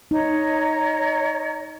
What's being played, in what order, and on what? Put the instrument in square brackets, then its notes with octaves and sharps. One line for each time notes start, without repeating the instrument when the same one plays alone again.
[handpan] D#4 [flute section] C#5 D#5 A#5